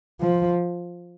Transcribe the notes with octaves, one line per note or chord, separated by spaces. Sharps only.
F3